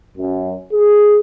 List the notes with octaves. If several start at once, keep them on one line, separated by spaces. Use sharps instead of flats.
F#2
G#4